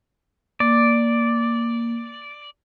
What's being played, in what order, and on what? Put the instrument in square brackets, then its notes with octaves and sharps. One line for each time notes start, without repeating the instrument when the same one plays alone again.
[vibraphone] A#3 [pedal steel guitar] D5